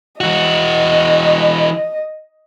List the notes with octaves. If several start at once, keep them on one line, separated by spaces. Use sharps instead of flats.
E3 F#4 D#5